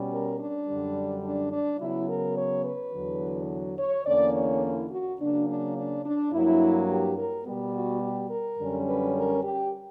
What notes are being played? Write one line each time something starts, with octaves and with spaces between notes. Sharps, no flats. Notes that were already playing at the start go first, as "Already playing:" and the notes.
Already playing: B2 G3 C#4
A#4
D4
F#2 D3 G3
D4
D4
C#3 F#3 B3 E4
A#4
C#5
B4
E2 D3 F#3
C#5
E2 D3 A#3 C#4 D5
C#5
E4
F#4
C#3 F#3 A#3 D4
D4
D4
D4
G2 F#3 A#3 E4
G4
A#4
B2 G3 B3 G4
F#4
G4
A#4
F#2 D3 G3 C#4
B4
A#4
G4